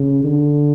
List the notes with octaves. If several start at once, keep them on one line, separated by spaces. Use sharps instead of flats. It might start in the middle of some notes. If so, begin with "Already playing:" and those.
Already playing: C#3
D3